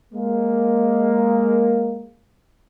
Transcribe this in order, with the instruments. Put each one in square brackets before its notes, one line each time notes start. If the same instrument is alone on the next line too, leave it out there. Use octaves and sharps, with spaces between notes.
[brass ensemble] G#3 A#3